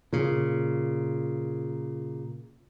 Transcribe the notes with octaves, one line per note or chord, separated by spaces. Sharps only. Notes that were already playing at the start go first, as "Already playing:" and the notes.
A#2 C#3